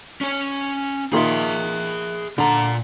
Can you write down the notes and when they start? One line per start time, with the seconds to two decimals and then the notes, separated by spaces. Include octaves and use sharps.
0.21 C#4 C#5
1.13 A#2 D#3 G#4 E5 C6
2.38 A#2 D3 A#5